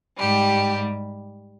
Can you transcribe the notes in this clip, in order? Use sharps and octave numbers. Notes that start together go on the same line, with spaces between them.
G#2 G3 G4